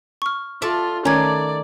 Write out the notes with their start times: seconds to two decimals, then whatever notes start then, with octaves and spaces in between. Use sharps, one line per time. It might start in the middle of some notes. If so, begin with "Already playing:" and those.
0.22 C#6 F6
0.62 F4 A4 D5 E5
1.05 D#3 A3 C#4 D5 A#5 G#6